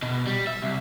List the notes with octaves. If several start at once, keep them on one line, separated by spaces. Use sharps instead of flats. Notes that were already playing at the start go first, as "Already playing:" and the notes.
B2
G3
E5
C2